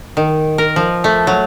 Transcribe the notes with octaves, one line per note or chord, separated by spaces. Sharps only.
D#3
A#4
F3
A3
F#3